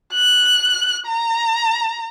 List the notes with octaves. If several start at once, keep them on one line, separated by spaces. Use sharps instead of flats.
F#6
A#5